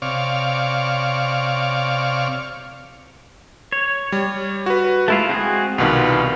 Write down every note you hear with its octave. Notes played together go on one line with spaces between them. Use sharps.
C3 C#5 D5 F5
C#5
G3
F#4 B4
G#3 A3 E4 F4
C4 F#4 G#4
C2 B2 D#3 F4 B4